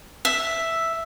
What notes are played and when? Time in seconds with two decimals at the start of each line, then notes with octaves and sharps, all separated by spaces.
0.25 E5